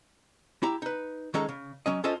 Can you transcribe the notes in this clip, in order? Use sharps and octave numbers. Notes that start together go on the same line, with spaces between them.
E4 G4 A#5
D#4 B4
D#3 G#3 C#4 A4 C#5 A#5
C#3
F#3 C#4 D#5
C#4 F4 A4 C5 D#5 E5